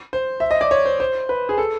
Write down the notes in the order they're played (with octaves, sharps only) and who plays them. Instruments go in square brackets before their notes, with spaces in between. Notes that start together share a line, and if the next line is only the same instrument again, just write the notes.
[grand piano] C5
E5
D#5
D5
C#5
C5
C5
B4
G#4
A4